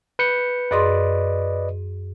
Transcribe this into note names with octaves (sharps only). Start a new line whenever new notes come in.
B4 G6 C#7
F#2 G#4 B4 D5 D#5 C6